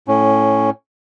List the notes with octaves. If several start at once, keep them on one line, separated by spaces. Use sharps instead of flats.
A2 C#4